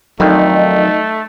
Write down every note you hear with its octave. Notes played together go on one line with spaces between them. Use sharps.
F2 D3 D#3 F#3 A3 D#4